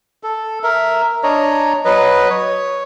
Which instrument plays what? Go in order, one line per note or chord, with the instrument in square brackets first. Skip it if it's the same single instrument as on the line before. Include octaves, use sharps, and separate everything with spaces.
[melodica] A4
A#4 E5
D4 C#5 D#5 A#5
F#3 B4 D#5
C#5